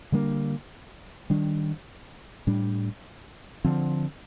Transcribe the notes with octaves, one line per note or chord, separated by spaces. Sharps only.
D3 G3 A#3 D4
D#3 G3 D4
A2 G3 D4
D3 F3 C4